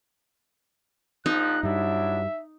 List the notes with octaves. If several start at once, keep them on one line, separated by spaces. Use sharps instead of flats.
A#1 F3 D#4 F#6
G2 F#3 G3 D4 E4 E5